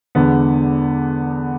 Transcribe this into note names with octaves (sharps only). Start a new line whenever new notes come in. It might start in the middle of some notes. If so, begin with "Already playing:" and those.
E2 D3 G#3 B3